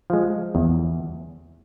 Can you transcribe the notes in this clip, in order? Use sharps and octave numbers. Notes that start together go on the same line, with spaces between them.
F3 G#3
E2